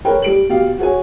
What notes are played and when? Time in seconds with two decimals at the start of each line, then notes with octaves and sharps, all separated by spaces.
0.05 G#4 A#4 B4 C#5 G5
0.22 G3 D7 F#7
0.49 B2 G4 F5
0.79 F#4 G#4 C#5 G#5